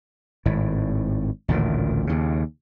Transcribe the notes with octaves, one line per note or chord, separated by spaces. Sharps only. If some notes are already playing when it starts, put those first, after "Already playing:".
G#1 A2
A1 D2 A#2 D#3
D#2 C#3